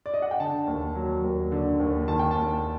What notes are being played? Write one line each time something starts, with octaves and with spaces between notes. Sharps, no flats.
D5
D#5
F#5
G5
D3 A5
D#2
F#3
D#2
D3
D#2
D#3 A5
G5
A5
D#2